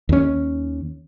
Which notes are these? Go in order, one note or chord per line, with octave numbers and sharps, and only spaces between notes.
D#2 C#4